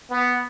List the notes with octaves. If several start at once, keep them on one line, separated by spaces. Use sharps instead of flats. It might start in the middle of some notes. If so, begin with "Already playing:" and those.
B3